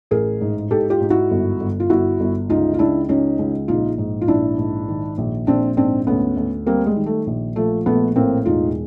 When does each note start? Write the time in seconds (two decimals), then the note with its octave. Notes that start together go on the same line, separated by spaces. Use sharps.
0.11 A1 G#4 A#4
0.41 G#2
0.70 G#2 G4 A4
0.90 F4 G4
1.01 G#2
1.10 E4 F#4
1.31 G1
1.60 G1
1.80 F4
1.90 G1 E4 F#4
2.20 G1
2.49 C#2 D#4 F4
2.74 F4
2.79 C#2 D4 E4
3.09 C#2 C#4 D#4
3.39 C#2
3.68 A#1 D#4 F4
3.98 G#2
4.21 F4
4.28 A#1 D4 E4
4.58 G#2
4.88 D#3
5.18 A#1
5.47 A#1 C4 D4
5.77 G#2 C4 D4
6.07 D2 B3 C#4
6.37 D2
6.67 G3 A#3 C4
6.86 G#3
6.96 D#3
7.06 A3
7.27 A#1
7.56 F3 A3
7.86 A#1 A3 B3
8.16 A2 A#3 C4
8.45 E1 D#4 F4